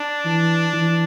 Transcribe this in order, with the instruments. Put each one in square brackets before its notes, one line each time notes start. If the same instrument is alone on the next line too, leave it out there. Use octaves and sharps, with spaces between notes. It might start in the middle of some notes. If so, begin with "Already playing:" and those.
Already playing: [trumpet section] D4
[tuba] E3
E3